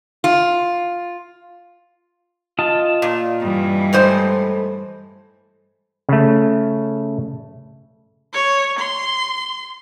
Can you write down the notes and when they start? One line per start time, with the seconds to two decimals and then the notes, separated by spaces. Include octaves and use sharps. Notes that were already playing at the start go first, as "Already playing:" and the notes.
0.24 F4
2.59 F4 D#5 A5
3.02 A#2
3.40 G2 E3
3.93 A2 G#3 C5
6.09 C#3 A3
8.33 C#5
8.80 C6